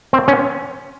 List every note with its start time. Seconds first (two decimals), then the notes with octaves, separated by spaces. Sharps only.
0.13 C4
0.28 C#4